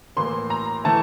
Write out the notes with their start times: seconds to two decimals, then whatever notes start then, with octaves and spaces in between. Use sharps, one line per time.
0.17 A2 E3 A#3 C6
0.50 A#5
0.84 E3 A3 E4 A5